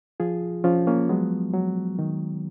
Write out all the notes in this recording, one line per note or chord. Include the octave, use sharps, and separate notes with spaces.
F3 F4 G#4
F3 C#4 F4
A#3 C#4
F#3 G#3 B3
F#3
D#3